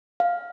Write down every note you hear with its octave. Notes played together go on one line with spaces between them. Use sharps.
F5